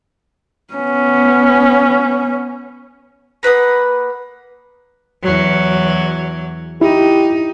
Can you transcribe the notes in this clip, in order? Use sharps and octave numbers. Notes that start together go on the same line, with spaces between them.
B3 C#4
A#3 B4 F#5 D#6
E2 F#3
D#4 E4 G4